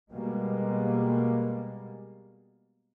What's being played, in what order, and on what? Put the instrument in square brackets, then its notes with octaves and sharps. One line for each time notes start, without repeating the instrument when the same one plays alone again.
[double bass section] B2 G3 G#3 A#3